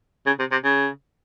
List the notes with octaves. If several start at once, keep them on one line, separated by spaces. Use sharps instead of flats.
C#3
C3
C3
C#3